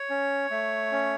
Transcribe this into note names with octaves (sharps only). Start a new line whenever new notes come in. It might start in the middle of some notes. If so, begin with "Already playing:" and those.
Already playing: C#5
C#4
A3
C#4